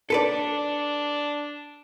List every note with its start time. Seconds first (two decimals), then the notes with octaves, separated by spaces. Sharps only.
0.10 D4 A4 B4 D5